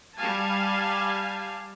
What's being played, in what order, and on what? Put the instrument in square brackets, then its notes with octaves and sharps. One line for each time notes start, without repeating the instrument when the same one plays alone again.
[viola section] G3 F5 G#5 A5